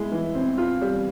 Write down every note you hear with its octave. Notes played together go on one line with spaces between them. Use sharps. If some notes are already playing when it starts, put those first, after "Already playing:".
Already playing: G#3 E4
E3
C4
F4
G3